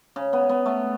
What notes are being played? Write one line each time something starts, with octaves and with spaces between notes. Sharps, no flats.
C#3
B3
B3
A3